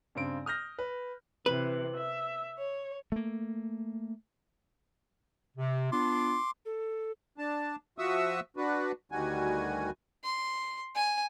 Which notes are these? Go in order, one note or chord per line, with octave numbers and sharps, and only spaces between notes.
G2 C#3 C4 D7
D#6 F6 G6 A#6
B4
C3 E3 B4
E5
C#5
A3 A#3
C3
B3 D4 F4 C6 D6
A4
D4 A5
F3 F#4 E5 C#6 D#6 E6
D4 F#4 B4
D2 D#3 G3 F#4 G#5
C6
G#5